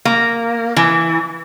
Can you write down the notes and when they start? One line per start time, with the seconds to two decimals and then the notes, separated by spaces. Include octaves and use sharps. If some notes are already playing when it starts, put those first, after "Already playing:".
0.05 A#3
0.76 E3